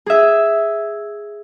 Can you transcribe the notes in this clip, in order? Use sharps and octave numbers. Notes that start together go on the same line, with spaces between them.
G#4 E5